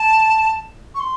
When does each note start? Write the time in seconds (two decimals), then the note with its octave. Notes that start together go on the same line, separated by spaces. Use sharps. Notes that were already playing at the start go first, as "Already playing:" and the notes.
Already playing: A5
0.95 C#6
1.00 C6